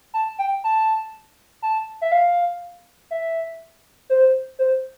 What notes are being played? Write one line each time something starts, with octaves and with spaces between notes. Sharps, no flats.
A5
G5
A5
A5
E5
F5
E5
C5
C5